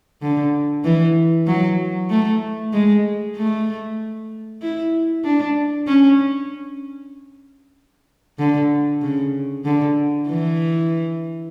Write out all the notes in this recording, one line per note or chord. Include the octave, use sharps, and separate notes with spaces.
D3
E3
F#3
A3
G#3
A3
E4
D4
C#4
D3
C#3
D3
E3